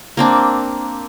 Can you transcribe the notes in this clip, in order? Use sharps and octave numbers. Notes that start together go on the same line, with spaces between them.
A#3 C4 D4